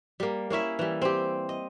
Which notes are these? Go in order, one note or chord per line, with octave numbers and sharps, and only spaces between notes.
G3 A#3
A#3 C#4 E4 E5
E3 G3
C4 G4
D#5